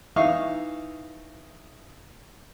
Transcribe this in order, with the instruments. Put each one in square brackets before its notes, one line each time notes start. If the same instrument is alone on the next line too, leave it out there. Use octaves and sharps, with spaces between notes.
[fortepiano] E3 D#4 E5 F5 C#6 D#6